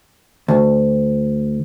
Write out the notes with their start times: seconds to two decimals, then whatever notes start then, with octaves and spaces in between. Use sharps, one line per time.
0.48 D2